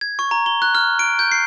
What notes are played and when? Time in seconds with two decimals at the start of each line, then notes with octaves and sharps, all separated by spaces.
0.01 G#6
0.19 C#6
0.31 A#5
0.46 G7
0.62 F#6
0.75 F6
0.99 D7
1.19 G6
1.32 C7